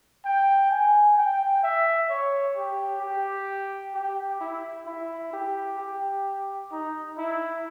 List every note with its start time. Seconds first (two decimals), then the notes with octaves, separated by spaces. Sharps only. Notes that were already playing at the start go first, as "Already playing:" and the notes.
0.25 G5
0.70 G#5
1.17 G5
1.63 E5
2.09 C#5
2.56 G4
3.02 G4
3.94 G4
4.41 E4
4.87 E4
5.33 G4
5.79 G4
6.72 D#4
7.18 E4